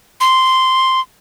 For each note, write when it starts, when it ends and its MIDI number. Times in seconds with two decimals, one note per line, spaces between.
0.21 1.00 84